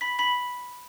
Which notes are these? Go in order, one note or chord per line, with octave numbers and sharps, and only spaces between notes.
B5 B6
B5 B6